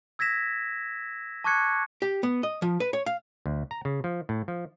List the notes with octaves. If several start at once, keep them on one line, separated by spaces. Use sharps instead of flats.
E6 G#6 A#6 B6 E7
A5 C#6 D6 F#6 G#6 C#7
G4
B3
D#5
F3
B4
C#5
F5
D2
A#5
C#3
F3
A2
F3